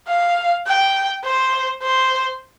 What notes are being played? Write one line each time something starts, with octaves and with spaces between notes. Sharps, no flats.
F5
G5
C5
C5